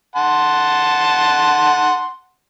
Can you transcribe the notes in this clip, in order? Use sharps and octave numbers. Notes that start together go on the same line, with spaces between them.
F#5 A5 C6